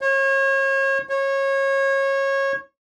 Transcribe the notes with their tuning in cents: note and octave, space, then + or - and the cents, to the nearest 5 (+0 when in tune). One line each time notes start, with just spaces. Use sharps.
C#5 -35
C#5 -25